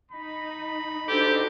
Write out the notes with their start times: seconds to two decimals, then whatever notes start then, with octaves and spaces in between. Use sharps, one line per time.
0.11 D#4 B5
1.08 D4 D#4 F#4 G4 A4 C5